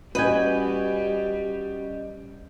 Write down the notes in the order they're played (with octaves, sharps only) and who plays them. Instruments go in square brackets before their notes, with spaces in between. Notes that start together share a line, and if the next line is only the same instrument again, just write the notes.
[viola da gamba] G3 [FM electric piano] C#4 D#5 G6 [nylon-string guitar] F#4 G#5 [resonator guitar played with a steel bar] B4